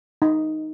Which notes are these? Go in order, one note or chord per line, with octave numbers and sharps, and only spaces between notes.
D#4